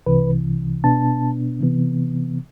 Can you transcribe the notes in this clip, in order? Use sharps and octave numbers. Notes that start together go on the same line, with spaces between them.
C2 C3 E3 B4
B2 B3 D4 A5
C3 E3 B3